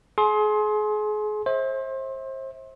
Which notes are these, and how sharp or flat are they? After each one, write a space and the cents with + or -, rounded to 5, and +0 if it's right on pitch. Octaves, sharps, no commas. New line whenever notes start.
G#4 +35 C6 +15
C5 +30 E5 -35